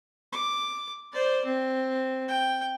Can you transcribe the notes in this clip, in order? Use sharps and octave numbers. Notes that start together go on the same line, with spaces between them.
D6
C5 D5
C4
G5